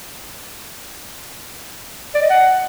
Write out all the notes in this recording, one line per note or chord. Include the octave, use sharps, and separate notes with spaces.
D5
D#5
F#5